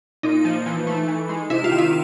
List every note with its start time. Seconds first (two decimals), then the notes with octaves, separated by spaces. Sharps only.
0.23 A#2 D#4
0.45 F3
0.66 E3
0.87 A3
1.08 E3
1.29 G#3
1.50 C3 E4
1.64 F4
1.71 D#3
1.78 E4